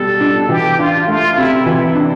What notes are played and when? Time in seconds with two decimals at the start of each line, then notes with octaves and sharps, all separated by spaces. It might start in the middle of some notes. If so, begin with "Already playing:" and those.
Already playing: B2 G3 A4
0.20 D4
0.49 E3 G4
0.79 D4 F4
1.08 A3 F4
1.37 C3 E4
1.66 E3 E4
1.95 D4